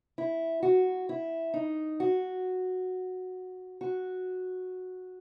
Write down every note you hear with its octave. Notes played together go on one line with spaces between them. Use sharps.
E4
F#4
E4
D#4
F#4
F#4